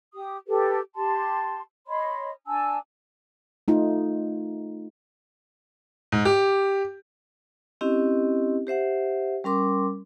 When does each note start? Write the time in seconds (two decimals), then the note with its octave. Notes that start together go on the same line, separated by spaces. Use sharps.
0.13 G4 D#6
0.47 G4 A4 B4
0.95 G4 A5 C6
1.87 C#5 D#5 B5 C6
2.48 D4 G#5 A5 E6
3.68 A3 D#4 F4
6.12 G#2
6.25 G4
7.81 C4 C#4 E4 G4 D#5
8.67 G4 C5 E5 F#5
9.44 G3 C#4 A#4 C6 D6